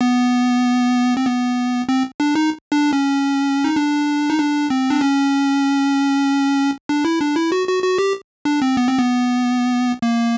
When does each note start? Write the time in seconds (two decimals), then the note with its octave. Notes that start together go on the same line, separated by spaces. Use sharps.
0.01 B3
1.17 C4
1.26 B3
1.89 C4
2.20 D4
2.35 D#4
2.72 D4
2.93 C#4
3.64 D#4
3.76 D4
4.30 D#4
4.39 D4
4.70 C4
4.90 D4
5.01 C#4
6.89 D4
7.05 E4
7.21 D4
7.36 E4
7.52 F#4
7.68 F#4
7.83 F#4
7.98 G4
8.45 D4
8.62 C4
8.77 B3
8.88 C4
8.99 B3
10.02 A#3